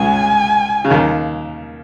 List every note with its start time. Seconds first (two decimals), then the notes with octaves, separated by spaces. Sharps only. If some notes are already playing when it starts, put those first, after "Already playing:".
Already playing: C#2 C#3 G#5
0.85 C#3
0.90 D#2 D#3